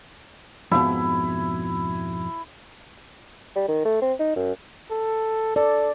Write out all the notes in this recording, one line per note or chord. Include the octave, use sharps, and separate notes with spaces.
F2 G#2 B2 E4
G3
D#3
A3
C4
D#4
F#2
A4
A4 D5